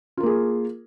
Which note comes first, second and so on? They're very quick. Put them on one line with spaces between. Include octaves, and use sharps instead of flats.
F4 A#4 A#3 G#4